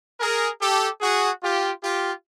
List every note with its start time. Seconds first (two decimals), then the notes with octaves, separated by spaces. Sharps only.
0.20 G#4 A#4
0.60 G4 A4
1.01 F#4 G#4
1.43 F4 G4
1.83 F4 G4